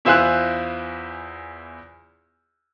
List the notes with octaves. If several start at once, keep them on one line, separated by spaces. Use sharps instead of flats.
E2 E4 F4 C5 G#5 F#6